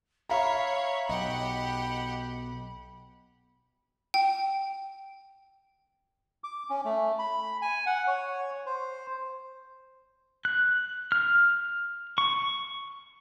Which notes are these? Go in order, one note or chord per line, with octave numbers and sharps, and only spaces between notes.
C#5 E5 F5 A#5 B5
B1 G4 D#5 F#5
G5
D6
C#4
A3
B5
G#5
F#5
C#5
C5
F#6
F6
C#6